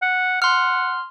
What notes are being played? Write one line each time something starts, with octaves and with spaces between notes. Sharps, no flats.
F#5
F#5 C6 F6